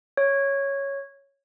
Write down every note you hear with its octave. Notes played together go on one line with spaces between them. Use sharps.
C#5